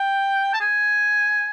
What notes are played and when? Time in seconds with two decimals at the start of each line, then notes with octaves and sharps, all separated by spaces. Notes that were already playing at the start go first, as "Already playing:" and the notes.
Already playing: G5
0.54 A5
0.61 G#5